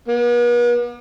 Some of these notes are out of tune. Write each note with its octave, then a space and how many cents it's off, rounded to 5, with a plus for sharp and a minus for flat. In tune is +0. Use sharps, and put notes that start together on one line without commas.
B3 -45